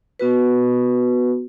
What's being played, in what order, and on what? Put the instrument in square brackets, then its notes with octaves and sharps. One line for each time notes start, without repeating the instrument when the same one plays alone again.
[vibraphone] B3 F#4 B4